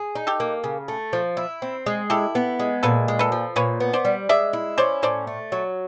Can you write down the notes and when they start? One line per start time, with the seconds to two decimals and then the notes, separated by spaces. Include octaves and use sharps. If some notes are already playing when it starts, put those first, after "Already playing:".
Already playing: G#4
0.15 D#4
0.27 G4 A4
0.40 A#3
0.64 C#3
0.88 A3
1.13 F3
1.37 E4
1.62 C4
1.86 G#3
2.10 E4 G4 A4
2.35 B3
2.60 G#3
2.83 A#2 A4 B4
3.08 G#3
3.19 A4 B4
3.32 F3
3.56 A#2 B4 C#5
3.80 B3
3.93 C5 D5
4.05 G3
4.29 G#3 D5 E5
4.53 E4
4.78 C#4 C5 D5
5.03 A2 C5 D5
5.27 A3
5.52 F#3